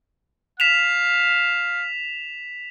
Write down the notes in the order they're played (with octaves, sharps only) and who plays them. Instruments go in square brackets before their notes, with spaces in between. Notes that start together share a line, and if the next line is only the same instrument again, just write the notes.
[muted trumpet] F5 [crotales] B6 E7 F7